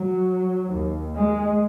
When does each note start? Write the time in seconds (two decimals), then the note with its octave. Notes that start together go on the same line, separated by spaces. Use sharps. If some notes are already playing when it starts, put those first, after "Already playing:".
Already playing: F#3
0.72 D#2
1.14 G#3